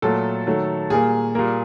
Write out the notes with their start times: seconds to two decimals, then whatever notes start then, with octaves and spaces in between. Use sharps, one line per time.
0.02 A#2 F#3 A3 A4
0.46 D#3 F#3 A3
0.90 A#2 G3 A#3 G#4
1.35 A#2 G3 A#3